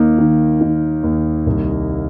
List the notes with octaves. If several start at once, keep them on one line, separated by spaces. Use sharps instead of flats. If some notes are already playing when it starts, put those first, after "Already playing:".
Already playing: D#2 A#3 D#4
D#3
D#3
D#2
C2